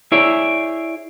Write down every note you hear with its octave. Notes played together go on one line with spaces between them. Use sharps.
E4 G#4 C#5 D5 E5